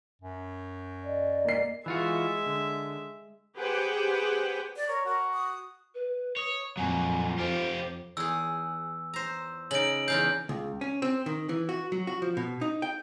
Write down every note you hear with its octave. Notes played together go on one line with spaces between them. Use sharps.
F#2
D5 D#5
A#3 C7
E3 G#3 F4 F#4 E5
D3
G4 G#4 B4 C5 F#5 G5
D5
A#4 C#5
F#4 A#4
D#6
B4
C#5 D#6
F2 A#2 F#3 G#5
F4 G4 C5
E2 G#4 E6
C5 A#5
C#3 D#4 D7 F#7
E2 C#3 F5 G6
C#2
C#4
C4
D#3
E3
F#4
F#3
F#4
F3
B2
D#4
G5